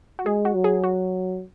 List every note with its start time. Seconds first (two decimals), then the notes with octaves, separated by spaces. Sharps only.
0.19 F#4
0.26 G#3 G#4
0.45 F#4
0.55 F#3
0.64 G#4
0.84 F#4